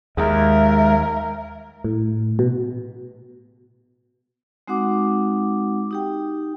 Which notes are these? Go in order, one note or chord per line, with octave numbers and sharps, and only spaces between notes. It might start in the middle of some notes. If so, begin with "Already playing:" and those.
D#2 G#3 A#4 E5
A2
B2
G#3 C4 D#4 F#4 F#5 D6
D#4 G4 G5